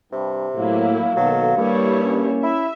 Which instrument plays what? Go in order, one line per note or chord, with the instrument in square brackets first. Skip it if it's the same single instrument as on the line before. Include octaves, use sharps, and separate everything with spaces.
[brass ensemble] G2 [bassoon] C3
[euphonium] A2 [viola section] F#3 A#3 E4 [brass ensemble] F5
[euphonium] B2 [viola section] D#3 A4 [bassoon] F#3
[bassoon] G2 [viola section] G3 E4 C#5 [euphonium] A#3
[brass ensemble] C#4
[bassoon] E4 [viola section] E5